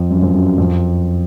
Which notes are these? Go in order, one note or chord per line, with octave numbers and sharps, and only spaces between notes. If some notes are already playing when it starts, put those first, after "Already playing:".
Already playing: F2
F#2
F2
F#2
F#2
F2